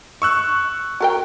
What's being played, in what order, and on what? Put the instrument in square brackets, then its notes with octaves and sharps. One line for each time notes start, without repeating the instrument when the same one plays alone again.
[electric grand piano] C#6 E6 F#6
[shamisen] F#4 A#4 G5